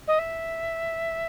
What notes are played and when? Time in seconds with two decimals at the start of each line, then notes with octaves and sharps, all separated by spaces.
0.07 D#5
0.18 E5